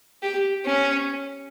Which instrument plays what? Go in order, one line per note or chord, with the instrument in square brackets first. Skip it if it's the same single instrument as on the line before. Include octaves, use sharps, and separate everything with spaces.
[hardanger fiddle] G4
C#4